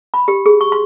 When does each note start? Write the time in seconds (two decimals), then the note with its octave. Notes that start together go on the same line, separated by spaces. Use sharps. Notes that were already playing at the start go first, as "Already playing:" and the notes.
0.14 B5
0.28 G4
0.46 G#4
0.61 C#6
0.72 C6